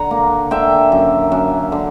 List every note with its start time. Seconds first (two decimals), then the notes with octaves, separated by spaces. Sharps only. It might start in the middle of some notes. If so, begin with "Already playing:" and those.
Already playing: D3 F#5 A#5
0.11 A#3
0.51 D3 E5 G5
0.92 F#2
1.32 F#2
1.72 D3